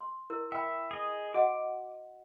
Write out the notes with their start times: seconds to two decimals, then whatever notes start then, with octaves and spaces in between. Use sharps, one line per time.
0.01 C6
0.30 E4 A#4
0.52 E5 G5 B5
0.91 G#4 D#5
1.34 F#4 D#5 F#5 D6